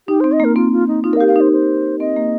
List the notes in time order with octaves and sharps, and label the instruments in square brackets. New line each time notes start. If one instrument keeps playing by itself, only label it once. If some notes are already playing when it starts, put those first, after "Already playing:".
[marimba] D#4 [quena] G4
[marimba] C4 [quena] C5
[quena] D#5
[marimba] A#3
[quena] A#4
[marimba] C4 [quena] F4
[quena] F4
D#4
[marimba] D#4 [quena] F4
[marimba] A#4
[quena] F5
[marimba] G4
[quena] F5
[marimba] D#4 [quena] C5
[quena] C5
[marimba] C4 [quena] D#5
[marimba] A#3